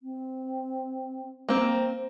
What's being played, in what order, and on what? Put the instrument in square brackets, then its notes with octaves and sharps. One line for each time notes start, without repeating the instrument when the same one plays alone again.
[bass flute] C4
[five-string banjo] A#3 C4
[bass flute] C5